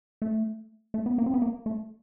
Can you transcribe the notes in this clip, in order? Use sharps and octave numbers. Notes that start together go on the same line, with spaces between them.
A3
A3
B3
A#3
C4
B3
A#3
A3